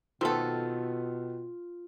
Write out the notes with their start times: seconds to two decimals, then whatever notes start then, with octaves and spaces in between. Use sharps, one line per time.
0.21 B2 D#3 A3 B3 C4 F4 A4